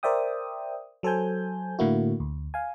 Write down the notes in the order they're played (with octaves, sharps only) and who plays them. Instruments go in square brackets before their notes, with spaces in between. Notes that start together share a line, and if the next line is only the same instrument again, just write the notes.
[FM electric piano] A#4 C5 D5 E5 G5 D#6
F#3 A4 C5 G#5 G6
A2 D3 A3 A#3 E4 F#4
D2
F5 G#5